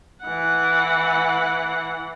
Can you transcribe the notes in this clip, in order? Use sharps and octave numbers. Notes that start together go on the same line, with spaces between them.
E3 F#5